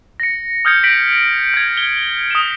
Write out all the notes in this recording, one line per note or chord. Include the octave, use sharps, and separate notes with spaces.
A#6 C#7
D#6 F6 G6 G#6 C#7
A#6 B6 D7 F#7
G6 G#6
G7
D#6 G#6 B6 E7